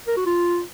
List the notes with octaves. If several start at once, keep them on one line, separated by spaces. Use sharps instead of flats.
A#4
F#4
F4